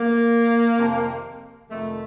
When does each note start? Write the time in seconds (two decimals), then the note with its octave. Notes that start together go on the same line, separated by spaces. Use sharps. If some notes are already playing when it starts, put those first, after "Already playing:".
Already playing: A#3
0.77 F2 C3 D#3
1.70 F2 C3 D#3 A3